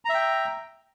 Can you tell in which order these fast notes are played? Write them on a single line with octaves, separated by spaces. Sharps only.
A#5 E5 G5